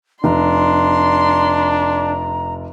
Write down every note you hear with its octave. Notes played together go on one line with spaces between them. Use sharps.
F1 D4 A#5 C6